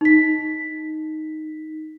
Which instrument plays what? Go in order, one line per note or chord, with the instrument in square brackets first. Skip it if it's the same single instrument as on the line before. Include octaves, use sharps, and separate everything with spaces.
[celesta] D#4 B6